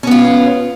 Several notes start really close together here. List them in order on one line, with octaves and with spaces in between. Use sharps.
C#4 B3 F4